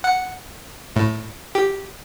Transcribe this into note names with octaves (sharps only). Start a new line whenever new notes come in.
F#5
A2
G4